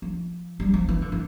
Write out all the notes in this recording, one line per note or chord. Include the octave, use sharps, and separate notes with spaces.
F3
G3
F3
E3
D3
E3